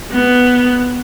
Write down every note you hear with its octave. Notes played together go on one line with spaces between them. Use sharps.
B3